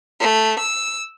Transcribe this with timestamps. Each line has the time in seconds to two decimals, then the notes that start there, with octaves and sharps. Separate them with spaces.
0.20 A3
0.60 E6